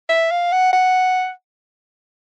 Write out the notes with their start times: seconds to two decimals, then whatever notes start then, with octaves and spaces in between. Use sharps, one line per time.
0.09 E5
0.31 F5
0.52 F#5
0.73 F#5